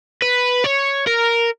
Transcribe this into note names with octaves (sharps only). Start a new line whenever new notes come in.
B4
C#5
A#4